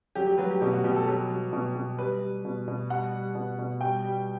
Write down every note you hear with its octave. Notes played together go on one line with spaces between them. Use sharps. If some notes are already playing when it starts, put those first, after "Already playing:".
F#3 G4
G4
F#3 B4
G4
B2 G4
F#4
B2 G4
A4
F#3 G4
F#3
B2
B2
G3 B4
G3
B2
B2
G3 F#5
G3
B2
B2
G3 G5
G3